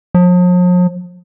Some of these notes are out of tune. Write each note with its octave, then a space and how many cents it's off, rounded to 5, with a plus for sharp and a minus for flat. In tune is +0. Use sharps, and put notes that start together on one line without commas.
F3 +45